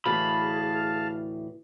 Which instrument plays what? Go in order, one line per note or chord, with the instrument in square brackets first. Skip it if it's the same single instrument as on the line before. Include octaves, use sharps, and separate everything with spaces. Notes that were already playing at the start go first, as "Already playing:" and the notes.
[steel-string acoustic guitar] D2 A2 E3 [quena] G#4 [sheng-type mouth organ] F5 A5 F6 [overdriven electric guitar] B5